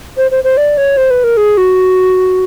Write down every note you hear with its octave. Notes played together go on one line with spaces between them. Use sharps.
C5
C5
C5
D5
C#5
C5
B4
A#4
G#4
F#4